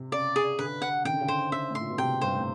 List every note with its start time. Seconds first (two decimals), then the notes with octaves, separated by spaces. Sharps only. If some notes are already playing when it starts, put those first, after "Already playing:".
Already playing: C3
0.12 C#3 D5
0.36 G#4
0.59 D3 B4
0.82 F#5
1.05 D#3 G5
1.13 D3
1.21 C#3
1.27 D3 C5
1.51 C#3 E5
1.70 A2
1.75 A#2 C6
1.90 B2
1.98 C3 G5
2.21 G2 C5
2.36 A2